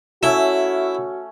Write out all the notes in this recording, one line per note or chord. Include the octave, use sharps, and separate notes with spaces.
A3 C#4 E4 F#4